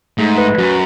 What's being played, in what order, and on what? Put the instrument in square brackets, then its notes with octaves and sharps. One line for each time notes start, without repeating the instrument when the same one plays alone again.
[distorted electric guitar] G#2 [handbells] A3
[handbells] B4
[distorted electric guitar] F#2 [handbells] F#4